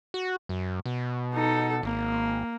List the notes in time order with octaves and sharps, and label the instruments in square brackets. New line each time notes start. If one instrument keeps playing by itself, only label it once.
[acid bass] F#4
F#2
B2
[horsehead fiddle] D#4 A4
[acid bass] G#1 [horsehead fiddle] A#3